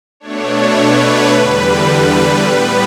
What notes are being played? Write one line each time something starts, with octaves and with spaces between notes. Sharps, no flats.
B2 A3 D4 C#5
B4
E2 D3 G3
A2 G3 B3 B4